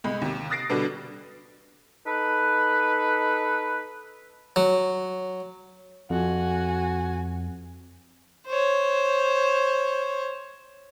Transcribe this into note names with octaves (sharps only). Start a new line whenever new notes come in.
C2 G#3 B5
D#2 C3
D#6 F#6 A6 A#6 C7 D7
B2 D3 G3 B3 D4 A4
D#4 A4 B4
F#3
F2 F#4 G#5
C5 C#5